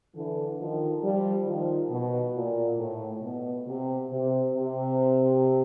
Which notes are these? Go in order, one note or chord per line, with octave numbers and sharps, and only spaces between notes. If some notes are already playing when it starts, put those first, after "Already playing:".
D3 E3
D#3 F3
F3 G3
D#3 F3
B2
A#2
A2
B2
C3
C3
C3